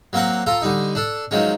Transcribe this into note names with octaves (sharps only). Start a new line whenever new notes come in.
F#3 A#3 C4 A#4 F#5
F4 A4 A#5
D3 G3 D#4
D4 A4
D#3 F3 F#3 G#3 C#4